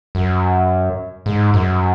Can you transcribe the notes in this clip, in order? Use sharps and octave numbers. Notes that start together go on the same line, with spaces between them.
F#2
G#2
F#2